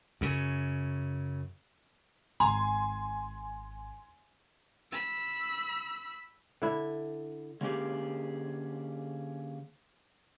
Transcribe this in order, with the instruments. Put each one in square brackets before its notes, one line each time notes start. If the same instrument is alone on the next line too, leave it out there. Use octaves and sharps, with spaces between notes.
[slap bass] F#2 C#3
[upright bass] G#1 [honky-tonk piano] G#5 C6 [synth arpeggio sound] A#5
[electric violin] B5 E6
[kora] D3 E4
[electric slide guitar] D3 F#3 A#3 C#4 G4 G#4